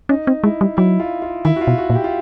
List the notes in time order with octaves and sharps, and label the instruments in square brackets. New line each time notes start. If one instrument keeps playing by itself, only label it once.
[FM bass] C#4 [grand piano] D#4
[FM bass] C4
[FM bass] G#3 [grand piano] E4
[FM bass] G3
[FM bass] F#3 [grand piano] E4
[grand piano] F4
F4
[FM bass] D#3 [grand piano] E4
[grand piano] F#4
F4
[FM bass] B2
[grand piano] F#4
[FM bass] A#2
[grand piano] G4
F4